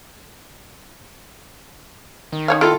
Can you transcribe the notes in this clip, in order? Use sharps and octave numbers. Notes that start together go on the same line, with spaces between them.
D#3
D#4 C#5 F5
E4 F4 A4 F5